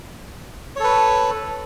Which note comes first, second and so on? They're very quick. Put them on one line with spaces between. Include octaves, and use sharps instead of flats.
C#5 A4 B4